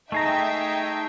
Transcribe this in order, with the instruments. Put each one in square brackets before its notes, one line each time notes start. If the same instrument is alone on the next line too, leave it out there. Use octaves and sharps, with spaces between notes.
[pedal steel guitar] A3 G#4 A#5 [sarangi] D#4 [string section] E5 G5